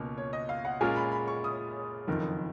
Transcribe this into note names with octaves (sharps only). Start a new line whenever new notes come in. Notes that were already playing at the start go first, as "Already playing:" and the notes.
Already playing: C#2 B2 A#3 C#4
C#5
D#5
F5
F#5
A#2 G#3 C#4 F4 A#4 G#5
B5
B5
C#6
D#6
F#1 F2 D#3